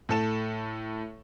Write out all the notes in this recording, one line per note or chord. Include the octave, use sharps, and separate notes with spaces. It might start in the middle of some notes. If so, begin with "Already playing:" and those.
A2 A4 E7